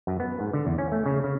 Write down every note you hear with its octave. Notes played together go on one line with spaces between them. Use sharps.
F#2
B3
G#2
D3
E2
C#4
A3
C#3
C#3